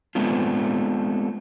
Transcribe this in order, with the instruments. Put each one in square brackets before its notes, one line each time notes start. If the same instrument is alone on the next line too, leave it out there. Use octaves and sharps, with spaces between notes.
[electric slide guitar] G#3 A3 B3 C4 D4 F4